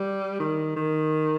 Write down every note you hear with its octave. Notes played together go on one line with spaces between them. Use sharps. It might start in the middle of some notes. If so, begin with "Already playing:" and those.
Already playing: G3
D#3
D#3